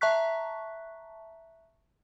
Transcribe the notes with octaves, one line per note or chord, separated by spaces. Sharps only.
E5 A5 A#5 C#6 F#6 B6